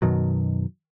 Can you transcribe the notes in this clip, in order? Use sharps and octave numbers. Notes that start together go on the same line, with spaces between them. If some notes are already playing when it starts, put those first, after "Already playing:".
F#2 B2 D#3 F#3